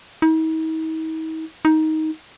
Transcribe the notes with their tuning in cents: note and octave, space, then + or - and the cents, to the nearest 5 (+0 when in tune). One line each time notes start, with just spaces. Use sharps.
D#4 +45
D#4 +15